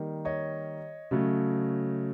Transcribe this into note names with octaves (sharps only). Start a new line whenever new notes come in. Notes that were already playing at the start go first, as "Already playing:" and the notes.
Already playing: D#3 G3 A#3 D#4
C#5 D#5
C#3 F#3 A3